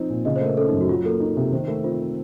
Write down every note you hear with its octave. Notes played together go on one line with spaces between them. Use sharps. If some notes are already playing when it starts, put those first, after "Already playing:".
Already playing: F3 C4 D#4
A#2
C#3 D#5
C5
A3
A#4
C#4 A4
D#4
F#2
F#4
F#3 F4
A#3 A4
D#4
C3
D#3 C5
A3 A#4
C4 F4